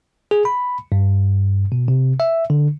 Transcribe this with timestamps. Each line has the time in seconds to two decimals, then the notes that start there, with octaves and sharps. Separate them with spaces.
0.31 G#4
0.45 B5
0.92 G2
1.72 B2
1.88 C3
2.20 E5
2.50 D3